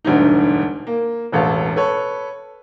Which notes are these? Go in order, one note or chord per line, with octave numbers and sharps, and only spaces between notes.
E1 D2 G2 D3 D#4
A#3
E1 A1 A4 F5
A4 B4 C#5